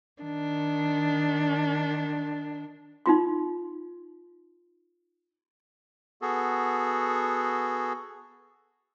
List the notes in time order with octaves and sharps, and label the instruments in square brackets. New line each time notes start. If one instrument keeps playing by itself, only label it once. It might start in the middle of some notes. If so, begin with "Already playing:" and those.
[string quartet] D#3 D4
[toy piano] D#4 F4 C6
[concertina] B3 F#4 G#4 A4